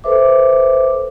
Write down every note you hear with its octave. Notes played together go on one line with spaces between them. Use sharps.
A4 B4 C5 E5 D6